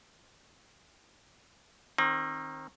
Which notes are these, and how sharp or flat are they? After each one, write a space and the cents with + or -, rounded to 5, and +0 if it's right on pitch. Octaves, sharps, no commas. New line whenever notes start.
D#3 +0 C4 +35